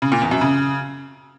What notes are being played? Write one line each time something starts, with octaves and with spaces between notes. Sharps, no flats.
C#3
A#2
E2
F#2
C#3